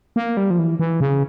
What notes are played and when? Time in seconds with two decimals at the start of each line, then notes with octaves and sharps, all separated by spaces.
0.16 A#3
0.37 G3
0.50 F3
0.59 E3
0.79 E3
1.00 C#3